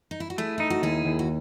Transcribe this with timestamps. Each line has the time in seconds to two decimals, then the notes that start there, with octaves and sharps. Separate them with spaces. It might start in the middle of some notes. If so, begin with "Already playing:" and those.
0.11 D#4
0.20 E4
0.30 F#4
0.38 A3 E4 G#4
0.58 D#4 E4
0.70 F#4
0.83 D#2 E4 G#4
1.05 D#2
1.19 F#4